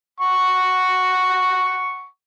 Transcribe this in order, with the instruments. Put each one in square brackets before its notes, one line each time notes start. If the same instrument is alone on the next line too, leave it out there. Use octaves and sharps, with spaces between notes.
[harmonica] F#5 C#6